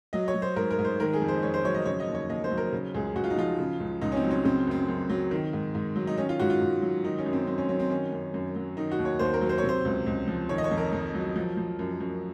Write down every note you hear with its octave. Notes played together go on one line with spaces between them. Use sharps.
F#3 D#5
C#5
F#3
C5
G#2 A#4
A#4
G#2
C5
D#3 A#4
G#4
F2
C5
F2 C#5
C5
F#3 C#5
D#5
C#3 C#5
D#5
D#2
C#5
D#2 D#5
C5
F#3
A#4
C#3
C#2 G#4
C#2 F#4
F4
D#4
F3 F4
C#3
C#2
C#2 D#4
C#4
C4
F#3
C#4
C#3 C4
F#2 C4
F#2
F#3
D#3
G#2
G#2
F#3
D#4
D#3 C#4
F4
G#2 F#4
F4
G#2
F#3
D#3 D#4
C#4
F#2
C4
F#2 C4
C#4
F#3 C#4
C4
D#3 C#4
F#2
F#2
F#3
D#3 D#4
F#4
D#2
C#5
D#2 C5
A#4
F#3
C5
C3 C#5
C5
C#2
C#2
F3
D#3 C#5
D#5
C#5
F2
A#4
F2
F#3
F3
F3
F#2
F#2